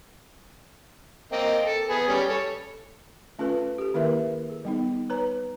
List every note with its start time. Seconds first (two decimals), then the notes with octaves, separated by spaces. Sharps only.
1.32 A#3 C4 D#5
1.65 A4
1.90 B3 G#4
2.08 G3 C#4
2.29 A4 C#5
3.39 A3 C#4 F4 A4 B4
3.78 G4 A4
3.94 D#3 A#3 E4 A#4 B4 E5
4.50 G#4
4.65 G3 B3 D#4
5.10 B4 C#5 A#5